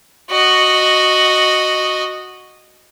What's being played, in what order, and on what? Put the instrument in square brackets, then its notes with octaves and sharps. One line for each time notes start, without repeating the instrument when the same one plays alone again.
[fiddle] F#4 D#5